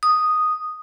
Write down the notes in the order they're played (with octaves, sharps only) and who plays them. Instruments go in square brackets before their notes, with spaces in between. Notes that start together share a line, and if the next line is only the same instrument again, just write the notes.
[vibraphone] D#6